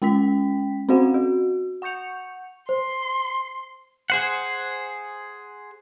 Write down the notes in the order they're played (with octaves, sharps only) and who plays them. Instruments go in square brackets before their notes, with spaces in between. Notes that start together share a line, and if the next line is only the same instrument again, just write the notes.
[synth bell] G#3 C#4 G5 B6
C4 C#4 F#4 C5 F5 F#5
F#4
F#5 C#6 G6 C#7 F7
[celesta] C5 [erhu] C6
[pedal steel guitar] G#4 C5 F#5